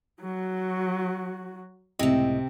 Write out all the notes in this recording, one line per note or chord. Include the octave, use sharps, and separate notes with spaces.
F#3 F#4
C#2 A2 C3 C4 D#5